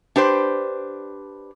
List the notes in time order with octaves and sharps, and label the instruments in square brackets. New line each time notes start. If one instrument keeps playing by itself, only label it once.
[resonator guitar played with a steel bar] D4 G4 B4 C5